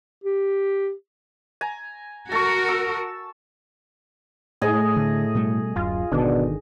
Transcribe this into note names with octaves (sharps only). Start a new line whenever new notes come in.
G4
G#5 A#5
F#4 A4 A#4 C#6
E6
A2 G#4 D#5
D3
B2 G3 A3
D1 F#2 F4
G#1 B2 D3 D#3 D4